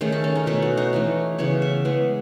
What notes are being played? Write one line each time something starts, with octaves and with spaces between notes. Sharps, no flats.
D#3 A3 C#4 G#4
A4
C#4
D#4
B2 A3 C#4 E4
F#4
D#4
E3 A3 C#4
C#3 E3 B3 C#5
E5
E3 G#3 B3